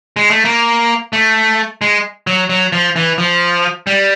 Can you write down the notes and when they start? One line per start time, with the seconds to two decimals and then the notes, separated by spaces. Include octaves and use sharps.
0.17 G#3
0.31 A3
0.45 A#3
1.13 A3
1.82 G#3
2.27 F#3
2.50 F#3
2.73 F3
2.96 E3
3.18 F3
3.87 G3